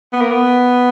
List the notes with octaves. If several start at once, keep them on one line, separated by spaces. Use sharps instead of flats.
B3
A#3
B3